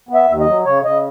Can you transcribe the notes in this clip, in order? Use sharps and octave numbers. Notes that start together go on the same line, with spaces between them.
B3
E5
D#2
D#5
F#3
C#3 C#5
C#3 D#5